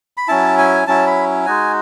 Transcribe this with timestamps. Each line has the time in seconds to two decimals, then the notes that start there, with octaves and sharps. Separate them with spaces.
0.17 B5
0.28 F#3 C#4 E4 A5
0.58 G#5
0.87 F#3 C#4 E4 A5
1.07 B5
1.46 G#3 D#4 F#4 G#5